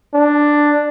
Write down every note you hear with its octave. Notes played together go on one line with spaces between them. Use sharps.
D4